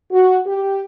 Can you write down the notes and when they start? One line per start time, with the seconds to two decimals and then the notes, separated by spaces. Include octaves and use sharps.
0.12 F#4
0.46 G4